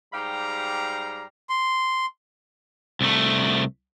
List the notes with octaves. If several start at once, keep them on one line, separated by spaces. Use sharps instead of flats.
G#2 G3 G4 F5 A#5
C6
C2 A3